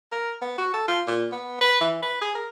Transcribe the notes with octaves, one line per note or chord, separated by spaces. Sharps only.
A#4
B3
F#4
A4
F4
A#2
B3
B4
E3
B4
G#4
A#4